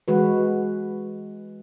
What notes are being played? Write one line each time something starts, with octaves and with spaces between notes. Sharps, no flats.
E3 G#3 F#4 B4